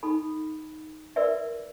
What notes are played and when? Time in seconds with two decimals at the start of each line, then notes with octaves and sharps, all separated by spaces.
0.03 D#4 A4 B5
1.16 A#4 B4 D5 E5